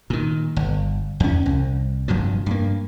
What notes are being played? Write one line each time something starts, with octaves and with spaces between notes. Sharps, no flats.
A#2 D#3
G1
E2 C#4
C2
F1 G2 F3 F#3
G2 A#3